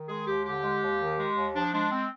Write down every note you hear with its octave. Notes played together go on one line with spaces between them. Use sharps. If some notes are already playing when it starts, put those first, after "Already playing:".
Already playing: D#3
G#3 G#4
D#2 G4
D3 G4
G#3
D#2
D#3
G#3
D#2
F3 D4
G#3 D4
C4